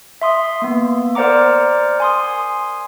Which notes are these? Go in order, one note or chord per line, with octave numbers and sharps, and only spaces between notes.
E5 C6 D#6
A#3 B3
A#4 C5 D5 F#5 A#5 D6
G#5 C6 D#6